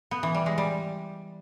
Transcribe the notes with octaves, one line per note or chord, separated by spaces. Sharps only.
B3
E3
G3
G#3
G3